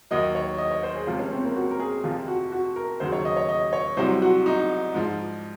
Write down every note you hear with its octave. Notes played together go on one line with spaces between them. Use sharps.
D#2 D#3 F#3 D#5
C#5
D#5
C#5
C5
G#4
C#2 C3 F3 F4
C#4
C4
A#3
F#4
A#4
G#4
F2 C3 F3 F4
F#4
F#4
A#4
D#2 C#3 F#3 C5
C#5
D#5
C#5
D#5
C#5
C2 C3 F#3 C5
F#4
D#4
G#2 F3